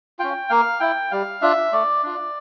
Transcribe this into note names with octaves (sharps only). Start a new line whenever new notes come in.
C#4 F4 G5
A#3 F5
E4 G5
G3 F5
D4 F4 E5
A3 D5
D4 F4